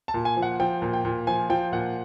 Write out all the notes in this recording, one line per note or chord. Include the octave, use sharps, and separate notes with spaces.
A5
A#2
G#5
F3
F#5
F3 G5
A#2
G5
A#2
F3 G#5
F3 G5
A#2 F#5